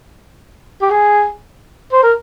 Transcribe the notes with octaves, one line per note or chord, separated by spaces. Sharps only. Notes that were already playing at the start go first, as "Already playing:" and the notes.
G4
G#4
C5
A#4